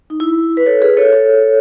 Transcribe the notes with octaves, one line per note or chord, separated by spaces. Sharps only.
D#4
E4
B4
A4 C#5
G#4 B4
A4 C#5
A4 C#5